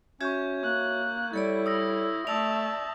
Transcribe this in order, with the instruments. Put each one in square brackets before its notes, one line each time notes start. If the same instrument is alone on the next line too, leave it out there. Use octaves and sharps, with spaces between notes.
[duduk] C#4 [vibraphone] F#4 C#5 E5 [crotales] C#6 G6 G#6
[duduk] A#3 [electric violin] F#6
[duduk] G3 [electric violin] E4 [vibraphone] A4 C#5 D5
[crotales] D#6 E6 A#6
[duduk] A3 [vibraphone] D5 [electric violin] E5 A5 [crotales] D#6 E6 F7